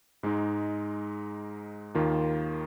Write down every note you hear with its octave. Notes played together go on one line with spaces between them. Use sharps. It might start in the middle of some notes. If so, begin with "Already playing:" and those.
G#2 G#3 D#4
D#2 D#3 A#3 F4